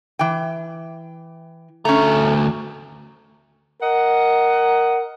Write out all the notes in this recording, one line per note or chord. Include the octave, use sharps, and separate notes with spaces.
E3 G5
D2 A3 C#4 A#5
A#4 D#5 F#5